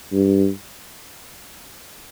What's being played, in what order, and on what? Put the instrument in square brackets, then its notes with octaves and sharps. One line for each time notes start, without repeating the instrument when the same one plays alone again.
[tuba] G2